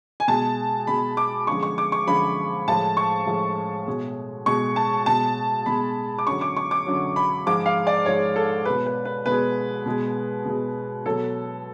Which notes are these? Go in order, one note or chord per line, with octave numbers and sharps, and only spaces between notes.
G#5
B2 G#3 A5
B2 G#3 B5
D6
F#2 D3 F3 G#3 C#6
C#6
D6
C#6
F#2 D3 F3 G#3 B5
A2 F3 G#3 A5
C#6
A2 F3 G#3
B2 G#3
B2 G#3 C#6
A5
B2 G#3 A5
B2 G#3 B5
D6
F#2 D3 F#3 C#6
D6
C#6
D6
F#2 D3 F#3
B5
G#2 F3 G#3 D6
F5
D5
G#2 F3 G#3 C#5
A4
B2 G#3 B4
B4
B4
B2 G#3 B4
B2 G#3
B2 G#3
B2 F#3 A4